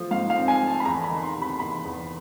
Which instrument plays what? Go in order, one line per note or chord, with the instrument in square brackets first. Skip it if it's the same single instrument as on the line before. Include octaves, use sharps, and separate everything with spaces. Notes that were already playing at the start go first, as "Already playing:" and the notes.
Already playing: [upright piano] F3 A3
G#2 F5
F5
C4
G#5
A3
A5
B5
E2 A#5
B5
D#3
C6
C3
B5
E2 B5
E2